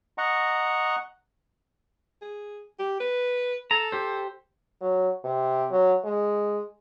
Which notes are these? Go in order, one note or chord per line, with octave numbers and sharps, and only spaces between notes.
D#5 F#5 A#5 C#6
G#4
G4
B4
A4 A#5
G4 C5
F#3
C3
F#3
G#3